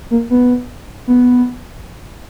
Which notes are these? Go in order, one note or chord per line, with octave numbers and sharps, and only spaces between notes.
A#3
B3
B3